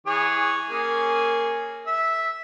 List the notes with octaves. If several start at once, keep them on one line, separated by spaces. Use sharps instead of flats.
E3 G#4 C#5
A#3 C#4 G#4
E5